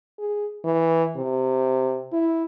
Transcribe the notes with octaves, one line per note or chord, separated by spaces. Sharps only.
G#4
E3
C3
E4